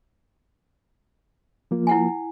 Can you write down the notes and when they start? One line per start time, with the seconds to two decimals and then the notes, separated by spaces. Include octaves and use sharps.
1.71 F3 A#3 F4
1.87 E4 F#5 G#5